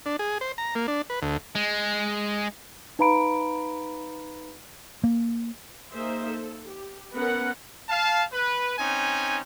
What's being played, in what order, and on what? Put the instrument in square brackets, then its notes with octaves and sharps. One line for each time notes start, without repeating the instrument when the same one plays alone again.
[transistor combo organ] D4
G#4
C5
A#5
A#3
D4
B4
D2
[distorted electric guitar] G#3
[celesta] D#4 B4 F5 A#5 B5 D7
[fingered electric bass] A#3
[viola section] A#3 D#4 G#4 C5 E5
A4
G4
B3 C#4 A#4 B4 F#5
[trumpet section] F5 A5
B4
C4 C#4 D#4 G#5